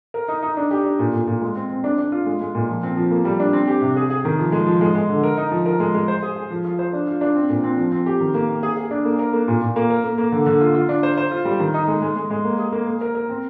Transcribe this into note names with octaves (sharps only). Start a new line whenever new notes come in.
A#4
D#4
D#4
D4
G4
D4
A#2
A#2
A#2
G#3
C4
C4
D4
D4
F4
G#3
G#3
A#2
F3
C4
F3
A#3
G3
D4
C4
G4
C3
G#4
G#4
D#3
F3
G#3
F3
G#3
G#3
D3
A#4
D#4
F3
A#4
G#3
G#3
C5
G#4
G#4
F3
F4
C5
D4
F4
D4
C4
A#2
C4
F3
C4
G4
D#3
A#3
A#3
G#4
G#4
D4
A#3
A#4
A#3
A#2
A#2
A#3
A#4
A#3
A#3
D3
D3
F4
F4
D4
C5
C5
F4
G3
D#3
D#4
G#3
G#3
G#3
G#3
A#3
G#4
A#3
A#3
A#4
A#4
C4